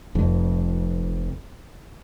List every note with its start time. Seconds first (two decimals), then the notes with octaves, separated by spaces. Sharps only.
0.15 F1 F2